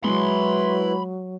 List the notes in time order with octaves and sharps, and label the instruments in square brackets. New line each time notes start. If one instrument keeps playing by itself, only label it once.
[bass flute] F#3 [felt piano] G#3 [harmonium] E4 B4 [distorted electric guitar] B5 C6